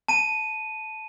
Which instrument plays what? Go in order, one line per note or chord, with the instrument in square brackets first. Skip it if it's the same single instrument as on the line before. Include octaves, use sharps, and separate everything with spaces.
[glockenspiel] A5 D#7